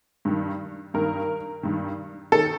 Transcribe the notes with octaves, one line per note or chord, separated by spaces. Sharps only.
G2 D#3
G2 D#3 A#4
G2 D#3
D#3 A4